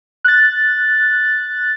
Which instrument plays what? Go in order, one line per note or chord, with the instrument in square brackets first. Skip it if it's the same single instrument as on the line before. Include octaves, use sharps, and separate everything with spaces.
[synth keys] F#6 A6